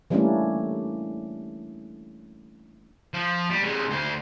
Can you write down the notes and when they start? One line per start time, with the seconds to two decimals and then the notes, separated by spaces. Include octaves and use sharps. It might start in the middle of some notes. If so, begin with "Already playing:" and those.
0.10 E3 G3 A3 A#3 C#4 D4
3.14 F3
3.51 G3
3.63 C3 G#3
3.90 D2 C5